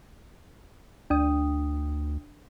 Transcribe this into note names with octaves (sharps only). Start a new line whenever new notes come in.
D2 D4 G5 D#6